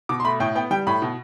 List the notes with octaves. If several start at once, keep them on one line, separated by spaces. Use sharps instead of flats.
B2 D6
C6
A3 B5
A2 G5
B3 G5
G3 G5
A2 B5
B2